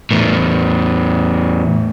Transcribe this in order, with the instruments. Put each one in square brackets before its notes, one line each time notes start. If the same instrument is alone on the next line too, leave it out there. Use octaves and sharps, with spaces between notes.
[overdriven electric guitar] E2 A2